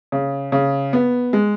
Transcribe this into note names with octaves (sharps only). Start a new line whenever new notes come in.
C#3
C#3
B3
G#3